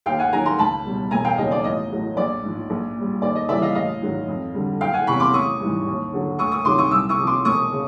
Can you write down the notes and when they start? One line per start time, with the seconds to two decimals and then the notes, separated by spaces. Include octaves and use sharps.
0.06 D#2 F5 G5
0.19 F#5 G#5
0.32 D#3 F#3 G#5 A#5
0.45 A#5 C6
0.59 C#2 A5 B5
0.85 B2 G3
1.11 E1 G#5 A#5
1.25 F5 G5
1.38 D#2 C#3 F#3 D#5
1.51 D5
1.64 A1 D#5
1.90 A2 F#3
2.17 A#1 D5
2.43 G#2 F3
2.70 A#1
2.96 A#2 G3
3.22 D#2 D5
3.35 D#5
3.49 C#3 E3 G3 D5 E5
3.62 D#5 F5
3.75 A1 D#5 F5
4.02 G#2 D#3 F#3
4.28 F2
4.54 D3 G3
4.80 F#1 F5 G5
4.94 F#5 G#5
5.07 E2 C3 B5 C#6
5.20 C6 D6
5.33 A1 C#6 D#6
5.60 G#2 E3 G3
5.87 D#2
6.13 D3 F#3
6.39 D2 C#6 D#6
6.52 C#6 D#6
6.65 C3 D#3 F#3 C6 D6
6.78 C#6 D#6
6.91 C2 D6 E6
7.09 C#6 D#6
7.18 C3 F3
7.27 C6 D6
7.45 E1 C#6 D#6
7.72 C#3